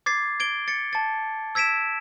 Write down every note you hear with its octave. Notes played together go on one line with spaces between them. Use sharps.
D6 G#6 A6 C7
G#6 D7 G7
A6 C#7
A5 A6
E6 G#6 B6 D7 E7